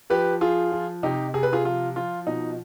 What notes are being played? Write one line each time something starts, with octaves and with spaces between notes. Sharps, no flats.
F3 G4 B4
F3 F4 G#4
F3
C3 D#4 G4
C3 G#4
B4
F4 G#4
F3 F4
F3 F4
B2 D#4